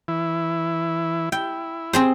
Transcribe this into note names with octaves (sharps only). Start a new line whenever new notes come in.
E3 E4
E4 G5
C4 G#4 C5